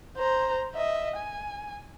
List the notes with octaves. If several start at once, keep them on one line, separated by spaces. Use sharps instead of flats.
C5 A#5
D#5 E5
G#5